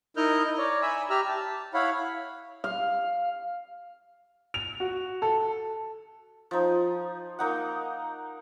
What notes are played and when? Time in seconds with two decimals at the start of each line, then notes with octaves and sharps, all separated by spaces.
0.17 D#4 E4 A#4 D#5 F6 G6
0.58 C#5 D5 A#5
0.82 E5 G#5 B5 E6
1.10 G4 E5 A#5 E6 F6
1.27 A5
1.74 E4 C#5 F5 F#5 B5
2.64 F5
4.54 F7
4.80 F#4
5.22 A4
6.51 F3 D#4
7.39 A#3 D#4 F#5